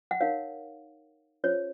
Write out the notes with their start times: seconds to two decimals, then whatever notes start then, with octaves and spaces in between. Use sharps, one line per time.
0.11 F#5
0.20 D#4 A#4 C#5 F5
1.44 C#4 F4 G#4 C5 C#5